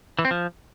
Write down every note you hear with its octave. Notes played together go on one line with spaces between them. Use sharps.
E3
C4
F3